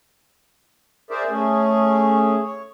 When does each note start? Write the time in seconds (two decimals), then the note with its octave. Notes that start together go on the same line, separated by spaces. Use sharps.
1.10 G#4 A#4 C5 D5 E5
1.30 A3 C#4 G#4
2.42 C#5